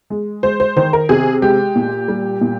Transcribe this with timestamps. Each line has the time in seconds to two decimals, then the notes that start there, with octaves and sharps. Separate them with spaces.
0.10 G#3
0.43 G#3 C5
0.60 C5
0.76 D#3 C5
0.93 A#4
1.09 C3 G#4
1.42 G#3 G4
1.76 A#2
2.08 G3
2.41 A#2